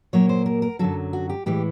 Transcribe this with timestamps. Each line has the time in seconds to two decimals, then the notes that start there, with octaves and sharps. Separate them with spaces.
0.13 A#2 F#3 A#3 C#5
0.29 C5
0.46 A#4
0.62 A#4
0.79 F#2 D3 F#3 A4
1.13 F#4
1.29 G4
1.46 A2 E3 G#3 G4